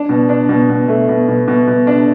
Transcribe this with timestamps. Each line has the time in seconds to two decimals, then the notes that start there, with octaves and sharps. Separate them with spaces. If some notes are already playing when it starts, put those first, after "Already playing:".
Already playing: D4
0.09 B2
0.29 D4
0.49 B2
0.69 B2
0.88 A3
1.09 B2
1.29 B2
1.48 B2
1.68 B2
1.87 D4